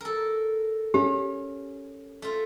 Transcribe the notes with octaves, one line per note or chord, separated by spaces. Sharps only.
A4 A#4
C#4 G4
A3 F4